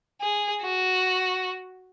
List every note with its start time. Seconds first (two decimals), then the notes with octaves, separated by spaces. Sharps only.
0.21 G#4
0.62 F#4